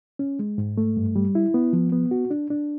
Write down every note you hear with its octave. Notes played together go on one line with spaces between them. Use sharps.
C#4
G#3
G#2
A3
G2
G3
E4
B3
F3
B3
F#4
D4
D4